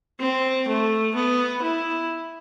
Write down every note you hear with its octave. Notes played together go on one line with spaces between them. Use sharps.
C4
A3
B3
E4